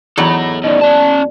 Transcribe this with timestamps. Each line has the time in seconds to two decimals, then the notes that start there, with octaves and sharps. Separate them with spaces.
0.18 E2 F#3 D#4 A4 B5
0.64 B2 D#3 D5 D#5
0.82 C#4 D5 A5